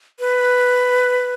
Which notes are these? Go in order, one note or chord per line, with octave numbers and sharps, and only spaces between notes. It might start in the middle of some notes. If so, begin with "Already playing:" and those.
B4